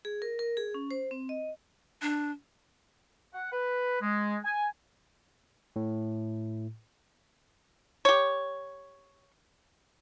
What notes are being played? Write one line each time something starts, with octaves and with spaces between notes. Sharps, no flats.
G#4
A#4
A#4
G#4
C#4
C5
C4
D#5
D4
F#5
B4
G#3
G#5
A2
G4 C#5